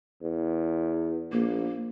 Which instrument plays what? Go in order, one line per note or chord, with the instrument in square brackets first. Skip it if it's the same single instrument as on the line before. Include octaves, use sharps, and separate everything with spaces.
[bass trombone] E2
[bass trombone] A#1 [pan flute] A#3